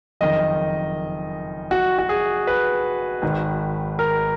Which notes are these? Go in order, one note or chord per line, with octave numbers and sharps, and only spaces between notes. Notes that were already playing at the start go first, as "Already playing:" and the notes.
F#1 F2 D#3 D#5
F#4
F#4
G#4
B4
G#1 G#2 D#3
A#4